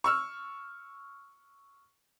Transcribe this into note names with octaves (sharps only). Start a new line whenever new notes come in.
C#6 E6 F6